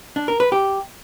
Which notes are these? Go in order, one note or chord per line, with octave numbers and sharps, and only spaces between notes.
D4
A#4
B4
G4